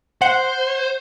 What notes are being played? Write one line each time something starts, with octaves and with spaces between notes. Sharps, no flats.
C5 F#5